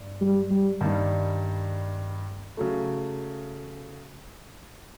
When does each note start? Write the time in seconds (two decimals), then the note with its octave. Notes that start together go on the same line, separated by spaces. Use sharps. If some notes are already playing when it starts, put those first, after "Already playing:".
Already playing: G2
0.21 G3
0.51 G3
0.81 G2 D#3 G3 A#3
2.57 C#3 F#3 A3